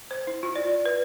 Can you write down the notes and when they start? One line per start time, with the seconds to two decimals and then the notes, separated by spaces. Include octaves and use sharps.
0.11 C5
0.27 E4
0.43 F4
0.56 D5
0.68 D5
0.86 B4